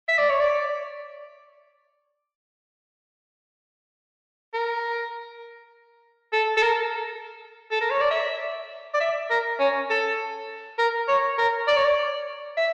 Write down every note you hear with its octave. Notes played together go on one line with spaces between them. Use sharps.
E5
D5
C#5
D5
A#4
A4
A4
A#4
A4
A#4
C#5
D5
E5
D5
E5
A#4
C#4
A4
A#4
C#5
A#4
D5
C#5
D5
E5